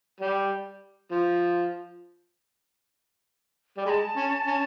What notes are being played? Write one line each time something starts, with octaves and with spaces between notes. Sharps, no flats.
G3
F3
G3
G#3 B5
A5
C#4
C#4